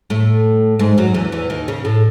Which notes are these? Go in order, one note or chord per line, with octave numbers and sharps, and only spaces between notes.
A2 A3
G#2 G#3
F#2 F#3
E2 E3
E2 E3
D#2 D#3
C#3
A2